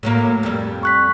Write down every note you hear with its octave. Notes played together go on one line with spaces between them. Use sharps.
A2 F#3 A#3
F2 G3
C#6 F#6 B6